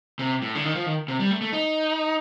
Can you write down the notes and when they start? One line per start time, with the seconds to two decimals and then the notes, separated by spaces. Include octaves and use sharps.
0.19 C3
0.42 A2
0.55 D3
0.65 D#3
0.75 F3
0.86 D#3
1.08 C3
1.20 G3
1.31 A3
1.41 A3
1.53 D#4